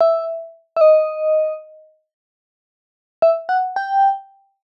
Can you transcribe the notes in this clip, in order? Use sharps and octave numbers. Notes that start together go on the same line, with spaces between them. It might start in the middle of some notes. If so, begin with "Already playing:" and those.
E5
E5
D#5
E5
F#5
G5